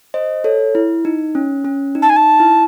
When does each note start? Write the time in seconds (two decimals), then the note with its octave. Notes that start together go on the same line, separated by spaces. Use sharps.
0.14 C5 D#5
0.44 A4 C#5
0.75 E4
1.05 D#4
1.35 C#4
1.65 C#4
1.95 D#4
2.02 A5
2.09 G#5
2.16 A5
2.40 E4